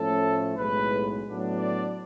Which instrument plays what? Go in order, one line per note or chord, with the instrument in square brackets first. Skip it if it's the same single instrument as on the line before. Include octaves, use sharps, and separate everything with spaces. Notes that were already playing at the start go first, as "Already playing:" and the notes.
Already playing: [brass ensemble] A2 F3 A3 C#4 A4
B1 A2 G#3 B4
A2 F#3 B3 D4
D5